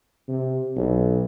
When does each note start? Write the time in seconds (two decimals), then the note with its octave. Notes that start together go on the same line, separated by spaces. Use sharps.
0.28 C3
0.76 B1